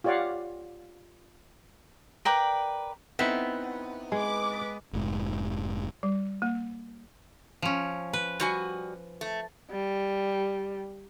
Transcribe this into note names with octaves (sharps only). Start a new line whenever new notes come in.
F4 G4 C#5 D5 F5 F#5
A#4 B4 D5 G5
B3 C4 D#4 E4 E5
G#3 B4 D6
F1 G#2
G3
A#3
F3 C#4
B4
G3 F#4 G#5
A3
G3